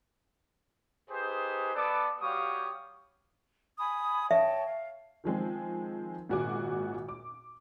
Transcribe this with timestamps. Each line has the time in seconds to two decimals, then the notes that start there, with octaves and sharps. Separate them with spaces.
1.10 D#4 G4 G#4 B4 C5
1.75 B3 A4 B4 D5 D6
2.21 G3 F#4 G4 C#5 F5 D#6
3.78 G#5 B5 D#6
4.31 C#5 E5 G5 A5
4.64 F5
5.24 D#3 F3 G#3 C4
6.29 G#1 A#2 F#4 G#4 G#5 D6
7.09 D6